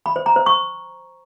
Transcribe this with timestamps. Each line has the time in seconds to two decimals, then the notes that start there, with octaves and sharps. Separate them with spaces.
0.06 B5
0.16 C5
0.26 A#5
0.36 C5
0.46 C#6